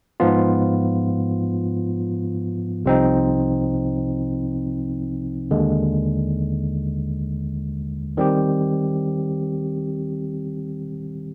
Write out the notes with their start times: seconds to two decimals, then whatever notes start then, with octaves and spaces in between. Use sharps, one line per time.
0.20 G#2 F3 B3 F4
2.85 C2 C3 F3 C4 D#4
5.51 D#2 D3 G#3
8.17 D#3 G3 C4 G4